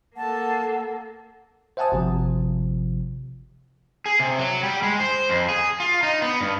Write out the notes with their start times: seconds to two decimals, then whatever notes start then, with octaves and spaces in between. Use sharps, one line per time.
0.17 A#3 A4 F#5 A5
1.77 C5 E5 F#5 G#5 A5 D#6
1.92 G#1 C3 F3
4.06 G#4
4.19 C3
4.39 F#3
4.63 G3
4.83 G#3
5.00 C5
5.29 F2
5.49 G#4
5.80 F4
6.03 D#4
6.22 B3
6.41 G2